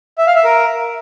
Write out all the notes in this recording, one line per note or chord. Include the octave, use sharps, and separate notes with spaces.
E5
F5
E5
A#4